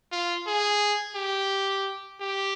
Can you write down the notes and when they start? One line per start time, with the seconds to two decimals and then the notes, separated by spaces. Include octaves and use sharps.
0.12 F4
0.47 G#4
1.16 G4
2.20 G4